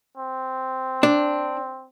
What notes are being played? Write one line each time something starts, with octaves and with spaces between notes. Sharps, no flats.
C4
D4